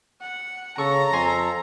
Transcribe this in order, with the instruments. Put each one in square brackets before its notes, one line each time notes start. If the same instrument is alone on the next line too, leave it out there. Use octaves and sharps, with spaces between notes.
[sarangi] F#5
[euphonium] C#3 [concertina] A4 [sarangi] A#5 [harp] C#6
[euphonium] F2 [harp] G#5 C6